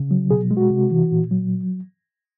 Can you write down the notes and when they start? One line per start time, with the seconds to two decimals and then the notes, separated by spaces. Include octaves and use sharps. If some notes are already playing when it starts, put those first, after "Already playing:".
Already playing: C#3
0.11 F#3
0.30 B2 G#4
0.51 G#3
0.57 F#4
0.70 C3
0.91 E3
1.12 A#2
1.31 F#3